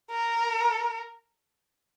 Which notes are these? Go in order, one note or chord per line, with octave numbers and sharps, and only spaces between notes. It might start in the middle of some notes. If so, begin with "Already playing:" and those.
A#4